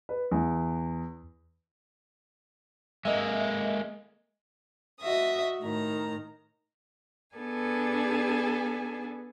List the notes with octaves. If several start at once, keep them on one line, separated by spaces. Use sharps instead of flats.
B4
E2
G#3 A#3 D#5 E5
F#4 D#5 E5 D#6
A2 D#3 A#5
B3 D4 G#4 A4 G#5